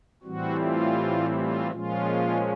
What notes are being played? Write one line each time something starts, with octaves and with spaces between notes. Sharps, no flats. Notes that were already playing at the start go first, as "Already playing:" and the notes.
A2 E3 G3 C4 F#4
F4
F4
A#2 F3 G#3 C#4 F4